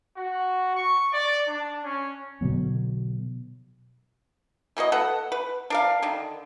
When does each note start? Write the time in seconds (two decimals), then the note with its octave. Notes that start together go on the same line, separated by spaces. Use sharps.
0.17 F#4
0.76 C#6
1.13 D5
1.48 D4
1.84 C#4
2.41 B2 D3 F#3 B3
4.77 E3 A#3 F#4 D#5
4.92 A4 B4 F#5
5.32 B4
5.70 D4 A#4 F5
6.02 D3 D#3